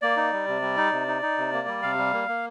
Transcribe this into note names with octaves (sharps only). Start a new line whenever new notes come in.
A#3 D5
D#4
G3
C3
G3
D#4
C3
D#4
D#4
C3
A#3
G3
C3 F5
G3
A#3
A#3